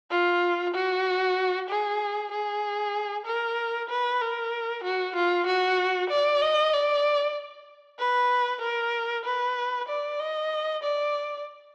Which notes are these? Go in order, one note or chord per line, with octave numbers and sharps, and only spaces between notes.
F4
F#4
G#4
G#4
A#4
B4
A#4
F#4
F4
F#4
D5
D#5
D5
B4
A#4
B4
D5
D#5
D5